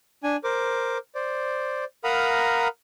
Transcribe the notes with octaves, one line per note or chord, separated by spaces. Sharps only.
D4 G#5
A#4 C5 D6
C5 D5
A#4 F5 F#5 A#5 B5 D#6